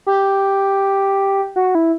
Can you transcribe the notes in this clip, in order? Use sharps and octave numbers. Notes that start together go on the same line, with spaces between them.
G4
F#4
E4